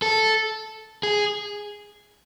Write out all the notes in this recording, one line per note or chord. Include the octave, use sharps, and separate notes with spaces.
A4
G#4